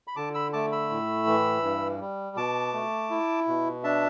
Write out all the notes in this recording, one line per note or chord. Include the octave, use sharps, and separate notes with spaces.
B5
D3 A5 D6
B5 E6
A3 A5 D6
B5 E6
A2
E3
G2
G3
B2 A5 D6
A3
E4
B2
D4 E5 A5